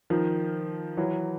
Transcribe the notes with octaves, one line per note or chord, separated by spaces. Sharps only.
D#3 F3
E3 F#3